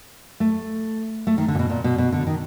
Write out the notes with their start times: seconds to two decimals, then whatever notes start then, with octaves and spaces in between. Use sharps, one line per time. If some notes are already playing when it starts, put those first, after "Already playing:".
0.40 A3
1.27 A3
1.38 D#3
1.48 D3
1.55 A#2
1.59 B2
1.70 A#2
1.84 B2
1.98 B2
2.12 D3
2.27 D#3